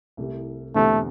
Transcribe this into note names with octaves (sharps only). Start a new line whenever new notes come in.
C2 C3 A3 E4 G4
E1 E2 D3 A3 C4 G4